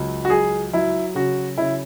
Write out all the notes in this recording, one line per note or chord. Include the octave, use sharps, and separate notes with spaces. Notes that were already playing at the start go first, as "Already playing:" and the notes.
Already playing: C#2 F#3
F#4
F#3 G#4
F#3 E4
C#3 F#4
C#3 E4